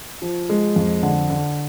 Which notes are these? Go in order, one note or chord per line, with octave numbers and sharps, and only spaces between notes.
F3
G#3
F2
D3
D3